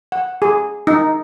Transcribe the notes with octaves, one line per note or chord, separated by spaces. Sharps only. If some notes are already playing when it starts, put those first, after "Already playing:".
F#5
G#4
D#4